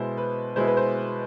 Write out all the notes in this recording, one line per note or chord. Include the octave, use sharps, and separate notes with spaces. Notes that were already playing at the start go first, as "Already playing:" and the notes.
Already playing: B2 G#3 B3 E4 C5
B4
B2 G#3 B3 E4 C5
B4
C5